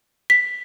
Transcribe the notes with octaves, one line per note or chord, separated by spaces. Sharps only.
B6